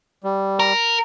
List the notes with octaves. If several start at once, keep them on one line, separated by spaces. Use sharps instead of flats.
G3
A#4